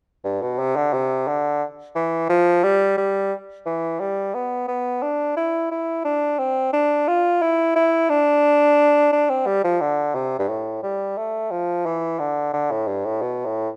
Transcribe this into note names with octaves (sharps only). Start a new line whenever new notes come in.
G2
B2
C3
D3
C3
D3
E3
F3
G3
G3
E3
G3
B3
B3
D4
E4
E4
D4
C4
D4
F4
E4
E4
D4
D4
C4
G3
F3
D3
C3
G2
A2
G3
A3
F3
E3
D3
D3
A2
G2
A2
B2
A2